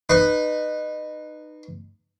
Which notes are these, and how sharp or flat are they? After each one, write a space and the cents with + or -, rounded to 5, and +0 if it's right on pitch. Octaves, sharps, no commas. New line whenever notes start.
D#4 -25 B4 +0